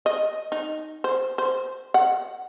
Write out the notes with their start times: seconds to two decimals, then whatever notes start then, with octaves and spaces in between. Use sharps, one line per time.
0.06 D#5
0.52 D#4
1.04 C5
1.38 C5
1.94 F#5